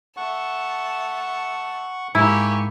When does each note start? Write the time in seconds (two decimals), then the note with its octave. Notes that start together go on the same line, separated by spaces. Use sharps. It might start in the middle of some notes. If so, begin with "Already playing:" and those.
0.17 A3 F#5 A5 C#6
2.15 G#2 A#3 E4 G4 E5 G#5 A#5 C#6